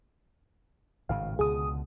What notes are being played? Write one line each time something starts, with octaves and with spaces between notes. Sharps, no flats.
G#1 A2 C#3 F5
C#2 B2 D3 G#4 D#6